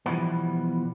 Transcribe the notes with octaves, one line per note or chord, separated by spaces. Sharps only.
B2 E3 F3 G3 B3